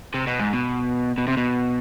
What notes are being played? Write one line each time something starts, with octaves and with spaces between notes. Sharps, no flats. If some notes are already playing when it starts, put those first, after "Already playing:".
C3
B2
G#2
B2
B2
C3
B2